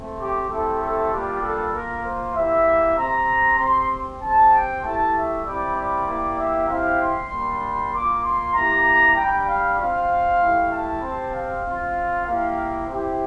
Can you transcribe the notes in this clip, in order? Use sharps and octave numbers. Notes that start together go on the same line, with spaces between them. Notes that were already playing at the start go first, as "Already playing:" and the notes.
Already playing: A3 C4
G4
A3 C4 E4 G4 A4
A4
G3 A#3 D4 F4 G4
A4
A#3 F4 A#4
C5
A#3 E4 G4 E5
C4 G4 A#5
C4 G4 C6
C4 G4 A5
G5
A3 E4 G4 A5
E5
G3 C4 E4 G4 D5
D5
A#3 E4 G4
E5
C4 E4 G4 F5
C6
G3 A#3 D4
A#3 F4 D6
C6
A#3 E4 G4 A#5
G3 D4 G4 G5
F5
C4 F4 F5
A3 E4 G4
A5
C4 G4
F5
C4 F4
A#3 E4 G4 F5
C4 E4 G4